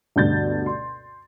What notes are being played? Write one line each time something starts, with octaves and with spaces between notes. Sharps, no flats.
D2 G2 B2 G6 A6
C6